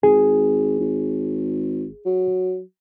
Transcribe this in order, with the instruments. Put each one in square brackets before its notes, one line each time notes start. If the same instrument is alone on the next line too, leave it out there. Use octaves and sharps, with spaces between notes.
[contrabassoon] G#1 [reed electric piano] G#4
[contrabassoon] G#1
F#3